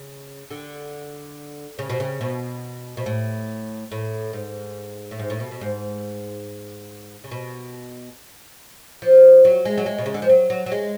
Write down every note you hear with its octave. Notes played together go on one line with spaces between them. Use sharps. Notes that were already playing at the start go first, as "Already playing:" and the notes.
Already playing: C#3
D3
C#3
B2
C#3
B2
B2
A2
A2
G#2
A2
G#2
A2
B2
B2
G#2
C#3
B2
F3
F#3
G#3
F#3
G#3
B2
C#3
D3
F3
F#3
F#3
F#3
G#3